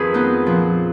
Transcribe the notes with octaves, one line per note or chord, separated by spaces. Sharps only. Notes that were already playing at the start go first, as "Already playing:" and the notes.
Already playing: F2 D#3 G#4 B4
B3 D#4
A#2 F3